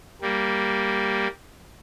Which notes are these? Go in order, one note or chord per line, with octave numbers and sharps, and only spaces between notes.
G3 A#3